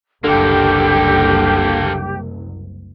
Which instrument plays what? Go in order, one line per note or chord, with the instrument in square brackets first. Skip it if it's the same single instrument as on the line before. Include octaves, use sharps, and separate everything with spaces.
[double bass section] F#1 C2 [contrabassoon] D3 [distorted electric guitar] A#3 A4 [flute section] G4